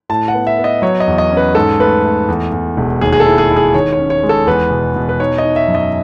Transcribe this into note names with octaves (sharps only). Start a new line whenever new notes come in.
A2 A5
F#5
B3
E5
B3
D#5
F#3 C#5
D#5
E2
D#5
C#4
B4
G#2 A4
A3 B4
A3
E2
E2
E1
D#2 G#4
G#4
A4
E4
G#4
E4
G#4
D#3 C#5
C#5
C#4
C#5
G#3
A4
E2 B4
B2
B2
B4
D#4 C#5
D#5
D#4
E5
F#2
D#5